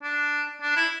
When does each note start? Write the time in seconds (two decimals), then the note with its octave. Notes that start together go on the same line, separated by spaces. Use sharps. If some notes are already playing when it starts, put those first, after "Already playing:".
0.03 D4
0.61 D4
0.76 E4